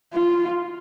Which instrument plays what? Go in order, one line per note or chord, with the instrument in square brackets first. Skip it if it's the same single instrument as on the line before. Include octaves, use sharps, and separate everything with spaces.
[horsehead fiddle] F4